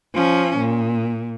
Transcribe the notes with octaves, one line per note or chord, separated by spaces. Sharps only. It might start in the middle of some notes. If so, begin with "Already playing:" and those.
F3 C#4
A#2